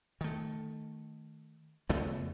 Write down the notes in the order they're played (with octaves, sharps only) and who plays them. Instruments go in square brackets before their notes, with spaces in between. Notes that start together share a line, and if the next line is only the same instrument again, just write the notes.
[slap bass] D#3 A3
F2 C#3 A3 B3